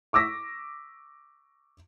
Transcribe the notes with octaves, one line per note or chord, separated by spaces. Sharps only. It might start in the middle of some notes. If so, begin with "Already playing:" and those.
C#6 D6 E6 A#6 B6